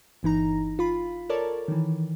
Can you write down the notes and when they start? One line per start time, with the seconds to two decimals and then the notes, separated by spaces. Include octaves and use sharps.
0.23 G1 E3 D#4 A#5
0.79 F4 B5
1.29 A4 A#4 C#5 D5 A5
1.68 D#3 E3